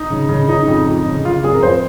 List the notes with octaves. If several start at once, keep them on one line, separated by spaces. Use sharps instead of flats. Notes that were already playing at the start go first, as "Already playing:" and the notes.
Already playing: D#4
C#3
C#3
C#3 D#4
F2
F2
C#3
C#3 F4
F2 G#4
A#4
F2 C5